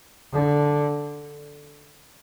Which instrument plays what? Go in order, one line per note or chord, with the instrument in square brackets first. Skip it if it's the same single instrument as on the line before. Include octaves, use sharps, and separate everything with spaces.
[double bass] D3